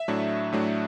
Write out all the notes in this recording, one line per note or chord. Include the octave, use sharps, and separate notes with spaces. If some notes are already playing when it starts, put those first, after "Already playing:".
Already playing: E5
A2 F#3 A3 D4
A2 F#3 A3 D4